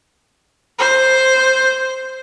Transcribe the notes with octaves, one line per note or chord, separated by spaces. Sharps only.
C5